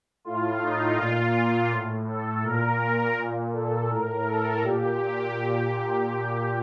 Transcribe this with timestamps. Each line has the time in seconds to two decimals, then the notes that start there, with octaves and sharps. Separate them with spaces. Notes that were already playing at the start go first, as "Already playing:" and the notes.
0.25 A2 F4
0.61 D#4
0.97 A#2 F4
1.71 A2
2.08 A4
2.44 A#2 A#4
3.17 A#2
3.53 A4
3.90 A2 A#4
4.26 A4
4.62 A#2 G4